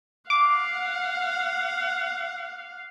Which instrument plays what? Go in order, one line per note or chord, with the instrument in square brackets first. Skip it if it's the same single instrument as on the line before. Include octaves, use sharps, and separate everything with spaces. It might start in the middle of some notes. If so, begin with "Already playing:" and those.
[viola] F5 F#5 [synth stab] D6